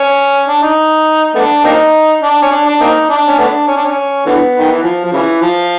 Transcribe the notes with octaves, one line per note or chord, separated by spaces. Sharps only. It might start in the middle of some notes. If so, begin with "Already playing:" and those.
Already playing: C#4
D4
D#4
A3 B3 D4
A#3 C4 D#4
D4
C#4
D4
D4
A#3 C4 D#4
D4
C#4
A3 B3 D4
C#4
D4
C#4
D3 E3 B3
D#3
E3
F3
F3
C#3 E3
F3